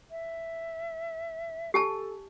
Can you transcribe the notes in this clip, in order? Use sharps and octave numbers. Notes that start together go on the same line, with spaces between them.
E5
G4 A4 G#5 A5